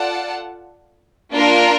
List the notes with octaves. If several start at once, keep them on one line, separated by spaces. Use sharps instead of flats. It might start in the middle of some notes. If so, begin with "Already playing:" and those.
Already playing: F4 A4 D5 F#5 A5
A#3 D4 F4 A#4